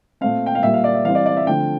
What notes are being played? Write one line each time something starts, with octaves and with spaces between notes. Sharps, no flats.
A#2 A3 C4 F5
G5
F5
A#2 G3 A#3 E5
F5
D5
E5
E3 G3 C4 F5
D5
D5
E5
D3 F3 A3 C4 G5